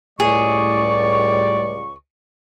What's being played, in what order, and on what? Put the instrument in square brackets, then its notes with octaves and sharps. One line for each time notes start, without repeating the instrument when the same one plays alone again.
[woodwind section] C#2 C#6 [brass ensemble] A2 G3 D5 [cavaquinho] G#4